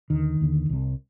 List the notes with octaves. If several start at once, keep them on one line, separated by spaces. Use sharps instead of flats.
D#2 D3 D#3
D#2 D3
C2 C3